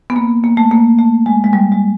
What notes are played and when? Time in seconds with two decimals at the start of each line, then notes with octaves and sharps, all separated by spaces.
0.10 B3
0.16 A#3
0.44 A#3
0.57 A3
0.71 A#3
0.99 A3
1.26 G#3
1.44 G#3
1.53 G3
1.72 G#3